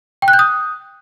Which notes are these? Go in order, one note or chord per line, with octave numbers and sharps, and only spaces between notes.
G5
F#6
G6
D#6